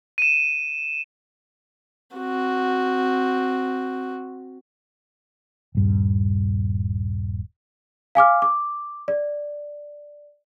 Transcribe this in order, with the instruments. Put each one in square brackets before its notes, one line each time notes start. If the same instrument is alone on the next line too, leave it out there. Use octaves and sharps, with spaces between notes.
[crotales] D#7 E7
[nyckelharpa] C4 F#4
[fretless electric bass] D#1 G2
[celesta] F5 G#5 D6 F6
D6
D5